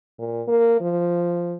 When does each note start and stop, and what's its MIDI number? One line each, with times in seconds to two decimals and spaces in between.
0.19 0.42 46
0.48 0.78 58
0.81 1.56 53